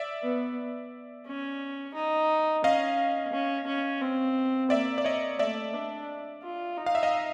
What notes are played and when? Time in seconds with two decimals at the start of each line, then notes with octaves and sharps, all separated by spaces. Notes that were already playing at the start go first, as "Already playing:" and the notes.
Already playing: D5 E5
0.23 B3
1.27 C#4
1.94 D#4
2.64 C#4 D#5 F5
3.33 C#4
3.67 C#4
4.01 C4
4.70 A#3 D5 E5
4.98 D5
5.04 C#5 D#5
5.39 A3 D5 E5
5.74 D4
6.43 F4
6.77 D#4
6.86 F5
6.95 E5
7.03 D#5 F5